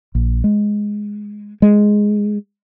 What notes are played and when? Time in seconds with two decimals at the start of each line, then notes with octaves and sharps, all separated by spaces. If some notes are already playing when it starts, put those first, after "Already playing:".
0.15 A#1
0.44 G#3
1.62 G#3